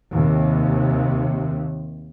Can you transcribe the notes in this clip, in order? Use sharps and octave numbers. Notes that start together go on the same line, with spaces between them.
D#2 C3